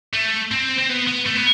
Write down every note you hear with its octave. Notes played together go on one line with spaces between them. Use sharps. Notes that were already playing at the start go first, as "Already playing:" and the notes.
A3
C4
C4
B3
B3
A3
B3